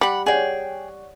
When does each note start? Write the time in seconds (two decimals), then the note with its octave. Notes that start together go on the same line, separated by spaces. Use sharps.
0.01 G3 F#5 B5
0.26 G#4 C#5 D5 F#5 G5